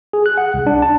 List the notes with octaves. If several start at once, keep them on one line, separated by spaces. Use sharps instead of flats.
G#4
F#6
F#5
C2
D4
A5